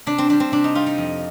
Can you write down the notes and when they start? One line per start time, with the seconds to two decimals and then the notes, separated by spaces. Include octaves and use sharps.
0.06 C3 D4
0.18 C4
0.29 G3 C4 D4
0.40 C4
0.52 C3 D4
0.64 D#4
0.75 G3 C4 F4
0.86 D#4
0.98 F2